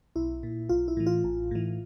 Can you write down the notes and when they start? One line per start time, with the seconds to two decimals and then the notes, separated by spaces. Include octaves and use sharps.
0.16 B1 E4
0.43 A#2
0.69 B1 F4
0.88 E4
0.97 A2 E3
1.06 F4
1.24 A1
1.51 A2 E3